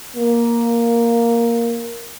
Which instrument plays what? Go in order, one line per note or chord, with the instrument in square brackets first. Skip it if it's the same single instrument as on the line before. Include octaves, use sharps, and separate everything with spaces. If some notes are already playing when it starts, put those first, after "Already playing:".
[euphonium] A#3